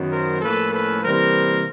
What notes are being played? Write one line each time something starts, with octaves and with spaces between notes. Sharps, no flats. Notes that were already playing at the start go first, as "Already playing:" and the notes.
Already playing: F#2 D#3 F#3 B3
A#4 C5
A2 F3 A#3 C#4 A4 B4
A4 B4
C3 E3 G3 A#3 A#4 C5